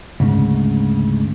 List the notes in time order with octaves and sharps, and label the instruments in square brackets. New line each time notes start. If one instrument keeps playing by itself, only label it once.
[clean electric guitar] D2 G#2 C#3